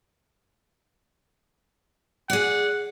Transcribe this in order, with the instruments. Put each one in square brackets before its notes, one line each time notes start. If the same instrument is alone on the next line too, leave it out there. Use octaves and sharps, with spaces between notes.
[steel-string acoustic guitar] G#4 D5 [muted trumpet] F#5